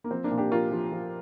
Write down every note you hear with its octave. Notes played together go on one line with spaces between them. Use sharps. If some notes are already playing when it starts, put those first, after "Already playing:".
A#3
F3 C4
A#3 D4
A#2
D4 G4
F3 F4 A#4
F3
F3